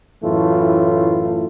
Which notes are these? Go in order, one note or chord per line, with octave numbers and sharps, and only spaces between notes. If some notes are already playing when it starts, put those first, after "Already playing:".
F#2 A2 E3 A3 F4